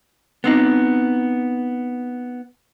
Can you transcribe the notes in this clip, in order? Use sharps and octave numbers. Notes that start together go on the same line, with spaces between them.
B3 C4 D#4